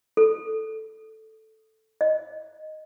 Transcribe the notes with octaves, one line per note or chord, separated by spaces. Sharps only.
A4
D#5